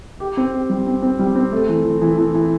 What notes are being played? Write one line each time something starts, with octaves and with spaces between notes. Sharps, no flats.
G4
C4
G4
G3
C4
C4
G3
C4
A3
E3
E3
E3
E3
E3